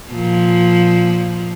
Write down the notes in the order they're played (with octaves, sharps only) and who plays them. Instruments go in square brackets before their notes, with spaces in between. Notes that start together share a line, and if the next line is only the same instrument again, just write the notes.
[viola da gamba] A#2 F3